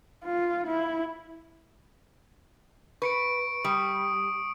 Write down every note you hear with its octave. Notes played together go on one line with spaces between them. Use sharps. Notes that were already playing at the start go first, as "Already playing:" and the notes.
F4
E4
B4 C#6 C#7 D7
G3 D#6